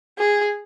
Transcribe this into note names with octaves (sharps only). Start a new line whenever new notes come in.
G#4